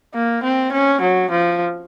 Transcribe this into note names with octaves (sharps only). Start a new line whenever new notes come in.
A#3
C4
C#4
F#3
F3